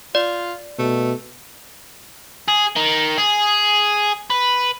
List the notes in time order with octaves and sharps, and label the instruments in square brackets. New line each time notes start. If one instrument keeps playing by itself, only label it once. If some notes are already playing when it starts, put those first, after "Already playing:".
[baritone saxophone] F4 [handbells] D5
[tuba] B2 [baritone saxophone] A3
[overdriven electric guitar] G#4
D#3
G#4
B4